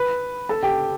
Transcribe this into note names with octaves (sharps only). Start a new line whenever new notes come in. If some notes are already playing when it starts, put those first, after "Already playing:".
Already playing: B4 B5
A4 A5
G4 G5